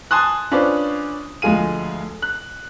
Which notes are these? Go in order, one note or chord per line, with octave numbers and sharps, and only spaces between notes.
G#5 A5 C6 D#6 F#6
C#4 D4 F4 B4 C5 D5
D2 F3 G#3 G#4 F5 D#7
F#6